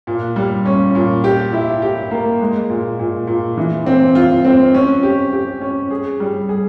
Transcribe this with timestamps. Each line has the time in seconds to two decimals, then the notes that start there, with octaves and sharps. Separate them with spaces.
0.07 A#2
0.36 G3
0.66 C#4
0.95 A#2
1.24 G4
1.53 E4
1.82 G4
2.11 A#3
2.41 G#3
2.70 A#2
2.99 A#2
3.27 A#2
3.57 E3
3.86 C4
4.15 F4
4.45 C4
4.74 C#4
5.03 G4
5.33 G4
5.61 C#4
5.91 G#4
6.20 G3
6.49 G#4